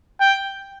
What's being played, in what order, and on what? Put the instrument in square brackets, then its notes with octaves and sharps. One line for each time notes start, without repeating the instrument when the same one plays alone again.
[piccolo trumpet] G5